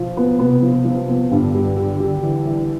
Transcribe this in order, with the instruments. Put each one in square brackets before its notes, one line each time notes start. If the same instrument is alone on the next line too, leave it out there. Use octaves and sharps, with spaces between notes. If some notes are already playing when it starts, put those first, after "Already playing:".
Already playing: [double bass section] B2 [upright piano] F3
[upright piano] B3
[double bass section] C3 [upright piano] B3
[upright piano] F3
F3
B3
[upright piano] G2 [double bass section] D3
[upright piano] G3
G3
G3
[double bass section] D3 [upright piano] E3
[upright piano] E3